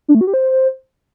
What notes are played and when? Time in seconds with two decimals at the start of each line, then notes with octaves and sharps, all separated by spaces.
0.08 D4
0.15 A3
0.21 F#4
0.27 G4
0.34 C5